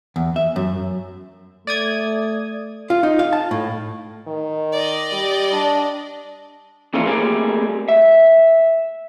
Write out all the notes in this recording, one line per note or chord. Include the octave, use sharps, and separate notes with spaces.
E2
E5
F#2
A3 D5 D#6 G#6
F4
D#4
F5
A5
A2
D#3
D5 D#5
G3
D4
F2 A#2 E3 C#4 F4
G3 A3 A#3 C4 G4 G#4
E5